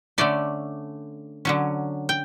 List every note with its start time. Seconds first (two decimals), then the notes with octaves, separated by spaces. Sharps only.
0.18 D3 A3 C#4 D5
1.45 D3 F#3 C#4
2.09 G5